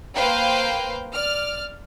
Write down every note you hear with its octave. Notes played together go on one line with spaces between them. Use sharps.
A#3 B4 C5 F5 G5
D5 F6